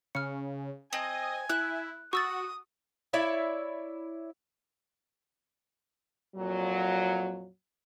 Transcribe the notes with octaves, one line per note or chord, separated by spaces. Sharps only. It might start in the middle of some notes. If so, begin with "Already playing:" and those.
C#3 F6 C#7
C4 D#5 G#5
E4 F#6
F#4 C#6 D#6 E6 A6
E4 C#5 D5 E5
F2 A#2 F#3